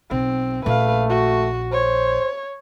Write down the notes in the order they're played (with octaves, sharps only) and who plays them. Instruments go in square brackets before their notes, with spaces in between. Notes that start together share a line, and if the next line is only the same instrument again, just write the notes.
[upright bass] B1 [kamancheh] C4
[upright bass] A#1 C#4 [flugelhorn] A3 [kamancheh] B4 F5
[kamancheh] F#4
[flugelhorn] C5 [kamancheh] C#5